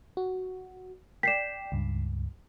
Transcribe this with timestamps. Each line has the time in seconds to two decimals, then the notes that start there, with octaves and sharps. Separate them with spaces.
0.17 F#4
1.23 D5 G5 B6 C7 E7
1.72 C#2 G2